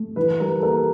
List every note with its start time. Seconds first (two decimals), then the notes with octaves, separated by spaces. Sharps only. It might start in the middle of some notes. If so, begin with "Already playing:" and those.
Already playing: A3
0.16 E3 B4
0.40 G3 A#4
0.59 A4
0.63 A#3 A#4